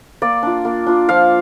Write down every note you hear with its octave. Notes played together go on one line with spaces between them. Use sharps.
A#3 D5
D4 F4
A#3
D4 F4
F3 F5